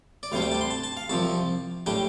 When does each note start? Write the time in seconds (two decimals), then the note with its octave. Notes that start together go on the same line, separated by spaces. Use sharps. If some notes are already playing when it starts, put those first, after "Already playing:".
0.23 D5
0.32 D2 C3 G3 D4 F5
0.42 G5
0.51 A5
0.61 C6
0.70 A5
0.84 A5
0.97 F5
1.10 C2 C3 F3 A5
1.86 A2 G3 D4 G5